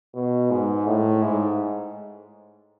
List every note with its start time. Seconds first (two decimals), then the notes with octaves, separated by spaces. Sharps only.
0.15 B2
0.50 G#2
0.87 A2
1.22 G#2